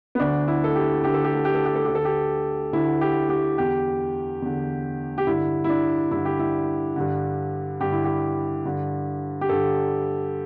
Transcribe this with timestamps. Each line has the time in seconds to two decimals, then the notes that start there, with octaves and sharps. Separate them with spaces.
0.15 B3
0.20 D2 D3 D4
0.48 E4
0.64 A4
0.75 G4
1.03 D2 D3 G4
1.14 A4
1.24 G4
1.35 A4
1.45 G4
1.55 A4
1.65 G4
1.75 A4
1.85 D2 D3 G4
1.95 A4
2.05 G4
2.73 D2 D3 E4
3.01 G4
3.29 G4
3.57 E2 D3 G4
4.42 E2 D3
5.18 G4
5.27 G2 D3 E4
5.64 E4
5.69 D4
6.11 G2 D3 E4
6.25 G4
6.39 E4
6.96 G2 D3
7.81 G2 D3 G4
7.92 E4
8.05 G4
8.65 G2 D3
9.41 G4
9.49 G2 D3 A4